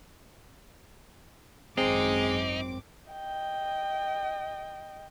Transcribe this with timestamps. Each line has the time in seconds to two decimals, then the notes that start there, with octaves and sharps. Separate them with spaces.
1.77 G#1 F#2 G#3 C4 D#4 D6
3.11 D#5 G5